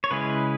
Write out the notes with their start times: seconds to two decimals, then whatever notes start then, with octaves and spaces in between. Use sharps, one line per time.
0.04 C#5
0.11 C#3 G#3 C#4 E4 G#4 B4